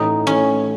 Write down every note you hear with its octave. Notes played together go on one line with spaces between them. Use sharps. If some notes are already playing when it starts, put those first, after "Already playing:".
Already playing: A1 A2 E3 A3 D#4
A2 E3 A3 C#4